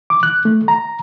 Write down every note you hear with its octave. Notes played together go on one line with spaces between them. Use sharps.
D6
F#6
A3
A#5